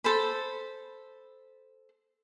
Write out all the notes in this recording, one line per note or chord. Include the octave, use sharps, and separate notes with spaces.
A4 C5 B5